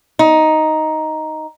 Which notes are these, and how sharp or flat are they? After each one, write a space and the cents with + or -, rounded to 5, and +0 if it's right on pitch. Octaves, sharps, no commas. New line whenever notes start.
D#4 +5